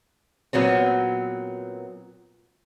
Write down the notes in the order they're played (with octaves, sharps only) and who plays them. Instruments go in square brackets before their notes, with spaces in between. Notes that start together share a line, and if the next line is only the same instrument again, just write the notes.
[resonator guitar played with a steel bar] A#2 F#3 B3 C4